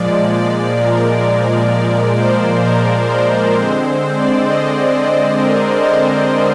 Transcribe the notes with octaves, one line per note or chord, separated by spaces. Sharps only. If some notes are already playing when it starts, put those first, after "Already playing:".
Already playing: A#2 F3 G#3 D5
D5
A#4
D5
C5
A#4
C5
D3 G#3 C4 C5
D5
D#5
C5
A#4
C5